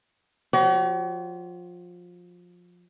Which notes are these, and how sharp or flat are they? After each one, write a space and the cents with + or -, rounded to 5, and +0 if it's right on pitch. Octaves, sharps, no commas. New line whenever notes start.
F3 +20 F#4 +45 C#5 +45